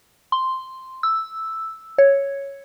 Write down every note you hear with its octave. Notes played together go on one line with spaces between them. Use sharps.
C6
E6
C#5